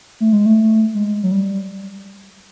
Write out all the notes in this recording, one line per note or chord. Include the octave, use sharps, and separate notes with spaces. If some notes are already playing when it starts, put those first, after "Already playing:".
A3
G#3
A3
G#3
F#3
G3